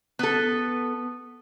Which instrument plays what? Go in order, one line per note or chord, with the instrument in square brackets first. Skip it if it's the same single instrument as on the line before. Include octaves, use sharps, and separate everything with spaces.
[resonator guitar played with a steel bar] B3 A4